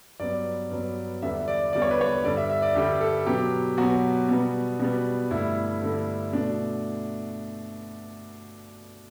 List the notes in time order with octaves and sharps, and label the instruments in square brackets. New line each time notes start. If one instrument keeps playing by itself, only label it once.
[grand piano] G2 F#3 B3 D5
G2 F#3 B3
E2 D3 G3 B3 E5
D5
E2 D3 G3 B3 D5
C#5
B4
C#5
G2 D3 G3 D5
E5
E5
D5
G2 D3 G3 G4
A4
B2 F#3 B3 G4
B2 F#3 B3 F#4
B2 G3 B3
B2 G3 B3
G2 D3 A3 E4
G2 D3 A3
B2 A3 D4